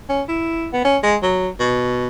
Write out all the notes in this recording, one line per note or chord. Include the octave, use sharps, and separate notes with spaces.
C#4
E4
B3
C#4
G#3
F#3
B2